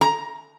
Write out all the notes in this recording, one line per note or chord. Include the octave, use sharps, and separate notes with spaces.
A#5